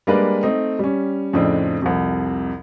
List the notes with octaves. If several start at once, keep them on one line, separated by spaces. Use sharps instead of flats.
G3 G#3 A#3 D4 B4 D5
A3 C4 D#4
G3 C#4
F2 A2 C#3 C4 D4 D#4
C2 F2 C3